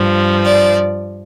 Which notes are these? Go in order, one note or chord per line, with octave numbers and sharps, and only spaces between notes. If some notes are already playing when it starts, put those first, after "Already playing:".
Already playing: G2 F3
D5